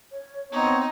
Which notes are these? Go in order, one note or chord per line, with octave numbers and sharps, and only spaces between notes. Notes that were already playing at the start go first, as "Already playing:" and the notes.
C#5
B3 C4 D#4 C#5